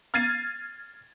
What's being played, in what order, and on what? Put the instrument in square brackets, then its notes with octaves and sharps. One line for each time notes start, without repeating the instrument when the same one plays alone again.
[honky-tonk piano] F6 G#6 A6 C7 D#7